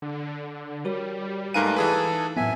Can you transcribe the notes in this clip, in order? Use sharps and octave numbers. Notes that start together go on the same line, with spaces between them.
D3
G3 F#4 A#4 C#5
G#2 A3 D#4 A#4 B4 F5 G#5 D#7
E3 G#4 A4 B4
F#2 A2 B3 E5 G#5